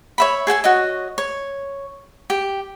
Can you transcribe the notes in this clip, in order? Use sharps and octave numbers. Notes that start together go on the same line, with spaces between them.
C#5 E5 B5
G#4 A4 G5 G#5
F#4 C#5 D#5
C#5
G4